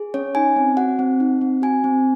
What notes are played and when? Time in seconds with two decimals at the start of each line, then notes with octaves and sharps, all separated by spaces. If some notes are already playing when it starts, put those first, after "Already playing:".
Already playing: G#4
0.14 C#4 C#5
0.35 D#4 G#5
0.56 C4
0.77 F#4 F#5
0.99 C4
1.20 D#4
1.41 C4
1.62 F#4 G#5
1.84 C4